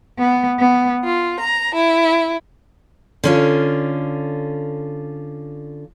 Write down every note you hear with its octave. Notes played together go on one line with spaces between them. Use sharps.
B3
B3
F4
A#5
E4
D3 C#4 F4